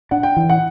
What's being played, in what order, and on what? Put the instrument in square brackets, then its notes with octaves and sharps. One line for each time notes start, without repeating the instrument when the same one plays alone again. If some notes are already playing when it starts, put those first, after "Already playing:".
[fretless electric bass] D4 [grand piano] F#5
[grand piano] G5
[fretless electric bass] E3
[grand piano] F#5